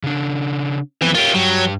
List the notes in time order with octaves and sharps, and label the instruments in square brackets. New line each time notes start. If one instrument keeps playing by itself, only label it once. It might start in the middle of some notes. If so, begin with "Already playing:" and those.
[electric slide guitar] C#3 D4
[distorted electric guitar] E3 [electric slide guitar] F3 B3 C4
[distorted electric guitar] F4 G4 [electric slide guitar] A#4 C#5
[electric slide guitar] G2 G4 [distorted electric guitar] F#3